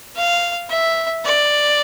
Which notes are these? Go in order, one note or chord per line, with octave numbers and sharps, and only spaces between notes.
F5
E5
D5